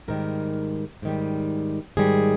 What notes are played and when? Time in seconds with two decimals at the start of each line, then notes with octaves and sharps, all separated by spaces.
0.08 G#2 D#3 G3 A#4
1.02 G#2 D#3 G3
1.97 G#2 D#3 G3 G#4